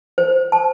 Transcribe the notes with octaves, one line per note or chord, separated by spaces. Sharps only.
C5
A5